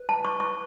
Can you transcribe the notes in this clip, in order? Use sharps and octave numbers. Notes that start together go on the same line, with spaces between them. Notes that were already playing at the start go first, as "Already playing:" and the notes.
Already playing: B4
A5
C#6
C#6